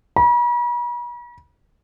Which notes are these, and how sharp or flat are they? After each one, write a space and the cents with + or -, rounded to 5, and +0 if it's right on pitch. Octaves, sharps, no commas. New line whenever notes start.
B5 -45